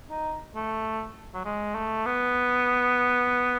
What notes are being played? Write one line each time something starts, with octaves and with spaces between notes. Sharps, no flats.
D#4
A3
F#3
G#3
A3
B3